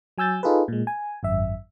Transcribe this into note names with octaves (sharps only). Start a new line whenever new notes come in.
F#3 G#5 E6 G6 A6
D#4 F4 G#4 A4 B4
A#2 G#3
G#5
G#1 F#2 E5